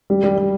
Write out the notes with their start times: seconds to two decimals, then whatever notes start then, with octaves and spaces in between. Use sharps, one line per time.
0.10 G3
0.23 G3
0.38 G3